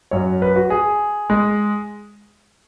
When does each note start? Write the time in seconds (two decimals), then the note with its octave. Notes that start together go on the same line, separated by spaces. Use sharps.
0.11 F#2 F#3 C#5
0.42 B4
0.56 F#4
0.70 G#4
1.30 G#3